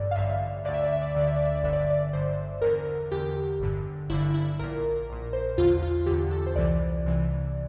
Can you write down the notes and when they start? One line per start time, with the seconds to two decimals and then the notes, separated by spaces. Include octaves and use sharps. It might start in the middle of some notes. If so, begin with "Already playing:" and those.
Already playing: A1 G2 D3 D5
0.11 F5
0.16 A1 G2 D3 E5
0.65 D2 D3 D5
0.74 E5
0.83 D5
0.93 E5
1.01 D5
1.10 E5
1.14 D2 D3 D5
1.27 E5
1.36 D5
1.45 E5
1.55 D5
1.63 G1 G2 D3 E5
1.73 D5
1.81 E5
1.90 D5
2.13 G1 G2 D3 C5
2.62 E2 D3 A#4
3.12 E2 D3 G4
3.60 G1 G2 D3
4.09 G1 G2 D3 E4
4.34 E4
4.59 A#1 A#2 A#4
5.09 A#1 A#2
5.33 C5
5.58 E2 D3 F4
5.83 F4
6.06 E2 D3 G4
6.31 A4
6.46 C5
6.56 C2 C3 E3 D5
7.06 C2 C3 E3